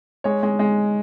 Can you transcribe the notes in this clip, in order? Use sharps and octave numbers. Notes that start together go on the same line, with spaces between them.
G#3 C#5
G#3
G#3